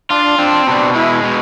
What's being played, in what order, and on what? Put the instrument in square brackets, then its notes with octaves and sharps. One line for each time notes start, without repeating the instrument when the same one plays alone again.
[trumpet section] D4 [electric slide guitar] F4
[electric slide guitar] C4 [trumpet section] D4
[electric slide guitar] B2 [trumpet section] D4
[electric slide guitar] G#3 [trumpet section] E4
[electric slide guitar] B2